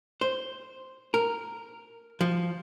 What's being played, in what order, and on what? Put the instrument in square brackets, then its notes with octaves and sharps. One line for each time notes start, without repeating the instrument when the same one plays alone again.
[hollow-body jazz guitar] C5
A#4
F3